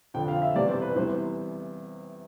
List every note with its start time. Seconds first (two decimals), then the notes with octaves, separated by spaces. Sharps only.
0.14 F2 D3 F3 G5
0.28 F5
0.42 E5
0.55 E2 C3 E3 G3 D5
0.69 C5
0.82 B4
0.95 E2 C3 E3 G3 C5